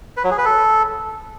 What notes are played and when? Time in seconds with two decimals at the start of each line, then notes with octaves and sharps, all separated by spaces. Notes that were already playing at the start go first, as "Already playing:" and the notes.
0.17 B4
0.24 F#3
0.31 G#4
0.38 B4
0.45 A4